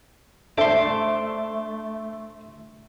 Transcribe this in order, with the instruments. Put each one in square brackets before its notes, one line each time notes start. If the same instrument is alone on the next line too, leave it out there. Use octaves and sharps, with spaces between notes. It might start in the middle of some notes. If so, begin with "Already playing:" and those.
[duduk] A3 [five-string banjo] D4 A4 C5 [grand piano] E5 [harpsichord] C6 D6